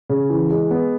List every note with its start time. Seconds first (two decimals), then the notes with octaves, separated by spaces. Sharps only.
0.10 C#3
0.30 E3
0.50 G#3
0.71 B3